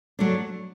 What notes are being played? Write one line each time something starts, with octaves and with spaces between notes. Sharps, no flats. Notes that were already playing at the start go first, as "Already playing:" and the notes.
F#3 A3 D4